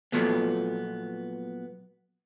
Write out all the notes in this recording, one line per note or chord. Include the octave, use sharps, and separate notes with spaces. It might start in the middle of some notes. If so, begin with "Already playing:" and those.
A#2 F3 F#3 A3 B3